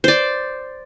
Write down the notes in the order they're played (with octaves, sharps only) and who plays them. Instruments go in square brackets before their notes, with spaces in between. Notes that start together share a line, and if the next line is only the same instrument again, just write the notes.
[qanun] C5 D5